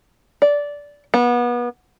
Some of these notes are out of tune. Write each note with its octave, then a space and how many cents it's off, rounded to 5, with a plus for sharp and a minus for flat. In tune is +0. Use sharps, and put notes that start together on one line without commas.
D5 -15
B3 -30